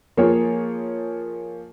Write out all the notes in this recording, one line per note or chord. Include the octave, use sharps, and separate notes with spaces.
F3 A#3 F4 G#4 C#5